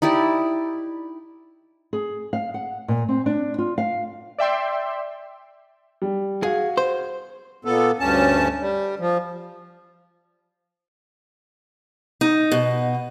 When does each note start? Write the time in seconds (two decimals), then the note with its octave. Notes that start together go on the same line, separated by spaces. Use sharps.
0.02 D#4 E4 G4 D5
1.93 G#4
2.33 F5
2.54 F#5
2.88 A#2
3.09 C4
3.26 D4
3.58 F4
3.78 F5
4.38 D5 E5 G5 C6
6.02 G3
6.43 F#4 G#4 F5
6.77 C5
7.65 A#2 B3 A4
7.99 D2 G2 C#4 A5
8.60 G3
9.00 F3
12.21 D#4
12.52 B2